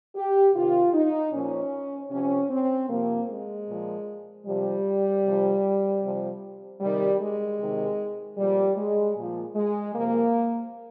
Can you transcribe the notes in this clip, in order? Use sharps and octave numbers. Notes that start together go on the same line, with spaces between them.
G4
C3 D#3 F4
D#4
A#2 F3 C#4
C3 F3 C#4
C4
C3 F3 A#3
G#3
A#2 F3
C3 F3 G3
C3 F3
C3 F3
C3 D#3 G3
G#3
C3 D#3
A#2 F3 G3
G#3
A#2 F3
G#3
C3 F3 A#3